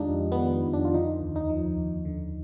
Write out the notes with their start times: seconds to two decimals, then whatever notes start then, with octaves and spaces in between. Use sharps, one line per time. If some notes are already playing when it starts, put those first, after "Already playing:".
Already playing: F2 D#3 G#3 D4 D#4 F4 G4
0.10 F2
0.32 B3
0.39 D#3
0.66 F2
0.73 D4
0.85 F4
0.94 D3 D#4
1.21 D#2
1.36 D#4
1.49 F3
1.77 D#2
2.05 D3